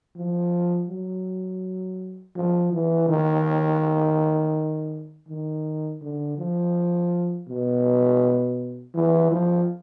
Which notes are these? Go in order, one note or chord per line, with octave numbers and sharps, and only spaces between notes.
F3
F#3
F3
E3
D#3
D#3
D3
F3
B2
E3
F3